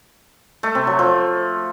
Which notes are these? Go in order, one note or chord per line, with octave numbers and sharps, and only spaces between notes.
A3
C3
F#3
F3